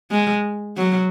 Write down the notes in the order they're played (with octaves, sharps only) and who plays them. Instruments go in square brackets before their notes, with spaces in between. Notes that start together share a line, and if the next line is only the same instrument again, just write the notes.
[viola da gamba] G#3
F#3